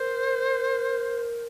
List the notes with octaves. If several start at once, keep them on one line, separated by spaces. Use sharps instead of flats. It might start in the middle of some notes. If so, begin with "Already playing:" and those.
Already playing: A#4 C5